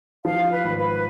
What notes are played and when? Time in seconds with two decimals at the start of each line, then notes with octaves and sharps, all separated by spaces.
0.25 F3 F5
0.51 B4
0.64 G#1
0.78 B4